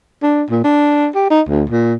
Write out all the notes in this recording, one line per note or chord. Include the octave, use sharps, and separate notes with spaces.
D4
A#2
D4
G4
D#4
D2
A#2